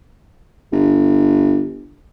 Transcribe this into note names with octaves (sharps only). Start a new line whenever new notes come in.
G1